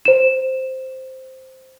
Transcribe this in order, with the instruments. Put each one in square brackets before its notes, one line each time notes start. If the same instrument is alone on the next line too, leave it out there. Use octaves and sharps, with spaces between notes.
[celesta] C5 E7